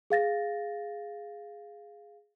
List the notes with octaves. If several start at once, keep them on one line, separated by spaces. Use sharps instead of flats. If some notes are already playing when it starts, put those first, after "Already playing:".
G#4 F5 A6 A#6